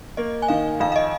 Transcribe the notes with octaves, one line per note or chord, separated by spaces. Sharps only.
A#3 D#5
G#5
D#3 F5
F2 F5
F5
D#5